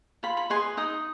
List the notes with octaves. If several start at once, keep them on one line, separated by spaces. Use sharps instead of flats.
F4 B5
B5
G#4 B4 D#5 C6
D#4 D#6